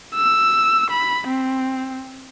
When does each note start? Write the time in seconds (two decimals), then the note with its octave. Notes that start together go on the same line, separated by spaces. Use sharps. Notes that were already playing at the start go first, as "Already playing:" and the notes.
0.15 E6
0.90 B5
1.28 C4